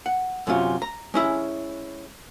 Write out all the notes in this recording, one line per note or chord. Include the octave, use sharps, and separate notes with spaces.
F#5
F#2 C3 C#4 F4
A#5
G#3 C#4 E4